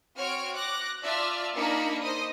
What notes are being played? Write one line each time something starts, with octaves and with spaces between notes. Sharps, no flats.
C4 F#4 C#5 F6 D7
D6 F#6 A#6
F4 D5 E5 A5 F6
A#3 D4 D#4 A#4 B5 C#7
C5 D#5 D#6